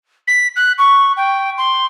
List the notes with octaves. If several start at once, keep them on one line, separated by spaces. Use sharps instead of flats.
B6
F#6
C#6
G5
C6